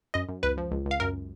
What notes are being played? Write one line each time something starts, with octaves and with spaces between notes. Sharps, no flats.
F#2 D#5
F#2
C#2 B4
F3
C#2
C#2
F5
F#2 A#4